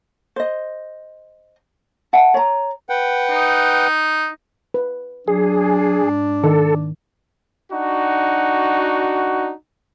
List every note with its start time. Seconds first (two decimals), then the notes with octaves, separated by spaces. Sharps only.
0.36 C5 D#5
2.13 E5 F#5 A5
2.34 C#5 A#5
2.90 B4 F#5 G5
3.31 D#4
4.74 B4
5.28 F#3 D4 G#4
6.03 G#2
6.44 D#3 A4
7.71 D4 D#4 F#4